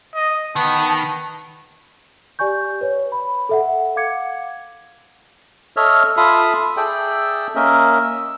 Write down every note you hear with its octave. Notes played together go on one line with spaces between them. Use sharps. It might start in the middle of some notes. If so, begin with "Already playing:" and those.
D#5
D#3 B3 A5
G4 D5 G#5 C#6 G6
B4 C#5
B5
A4 E5 F#5
F5 F#5 D6 G#6 C#7
A4 C#5 D#5 E5 F6
F4 A4 E5 F5 B5 D#6
G#4 A4 D5 E5 G5
A#3 C#4 A#4 D#5 E5
E6